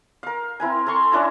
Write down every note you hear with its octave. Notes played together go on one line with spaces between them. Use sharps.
A#4 F5
C4 E4 A#4 G#5
A4 A#5 C6 C#6
C#4 D4 E4 A4